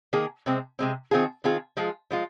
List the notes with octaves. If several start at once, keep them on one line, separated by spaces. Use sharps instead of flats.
D#3 A#3 G#4
C3 G#3 C4
C3 G#3 C4
D#3 C4 F4 G#4
D#3 C4 F4 G#4
F3 G#3 F4 G#4
F3 G#3 F4